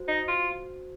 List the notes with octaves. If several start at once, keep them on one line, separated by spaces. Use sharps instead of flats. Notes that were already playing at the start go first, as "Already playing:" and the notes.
Already playing: F#4 C5
D#4
F4